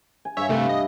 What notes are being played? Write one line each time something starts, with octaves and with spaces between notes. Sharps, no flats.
G#5
G2 C#5 E5 F5
C3 A3 B4 D5 E5
D#5